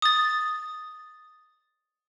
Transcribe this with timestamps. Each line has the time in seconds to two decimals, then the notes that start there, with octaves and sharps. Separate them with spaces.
0.02 D#6 A6